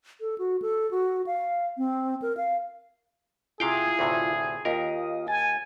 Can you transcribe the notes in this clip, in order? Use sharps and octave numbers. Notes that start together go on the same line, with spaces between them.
A4
F#4
A4
F#4
F5
C4
A#4
F5
C3 E4 F4 G#4 F5 G5
D2 A2 C3
D#2 F4 A#4 D#5
G#5 A5